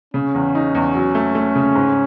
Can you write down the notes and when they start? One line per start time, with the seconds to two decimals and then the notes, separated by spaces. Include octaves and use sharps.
0.14 C#3 C#4
0.34 E2
0.55 D#4
0.75 E2
0.95 F#3
1.15 A3
1.35 A3
1.55 C#3
1.75 G#2